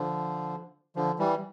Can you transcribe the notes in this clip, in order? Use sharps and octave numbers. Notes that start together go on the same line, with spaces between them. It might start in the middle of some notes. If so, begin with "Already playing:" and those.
Already playing: D3 F3
D3 F3
E3 G3